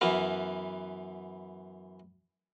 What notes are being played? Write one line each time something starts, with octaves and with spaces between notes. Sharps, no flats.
F#2 E3 B3 F5